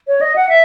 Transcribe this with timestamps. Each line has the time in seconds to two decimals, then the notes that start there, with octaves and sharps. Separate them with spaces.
0.07 C#5
0.21 D#5
0.36 F#5
0.49 E5